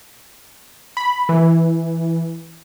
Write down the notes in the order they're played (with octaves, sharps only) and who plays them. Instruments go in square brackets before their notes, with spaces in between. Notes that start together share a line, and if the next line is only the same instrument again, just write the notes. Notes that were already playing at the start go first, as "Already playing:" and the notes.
[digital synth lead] B5
E3